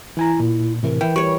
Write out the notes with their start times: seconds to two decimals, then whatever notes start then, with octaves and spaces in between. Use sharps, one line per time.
0.17 E3 E4 G#5 A#5
0.40 A#2
0.83 A2 C3 E3 A#4
1.01 E3 G5
1.16 G3 C#5 C#6